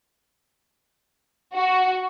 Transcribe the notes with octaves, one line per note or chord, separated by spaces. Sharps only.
F#4